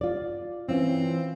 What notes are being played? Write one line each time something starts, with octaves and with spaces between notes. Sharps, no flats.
F4 D5
E3 C4 C#4 F4